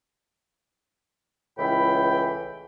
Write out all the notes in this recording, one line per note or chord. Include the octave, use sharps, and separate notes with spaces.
C#2 A2 E3 G5 B5